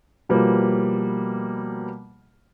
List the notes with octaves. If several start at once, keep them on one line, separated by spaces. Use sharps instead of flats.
B2 F3 G3 A#3 B3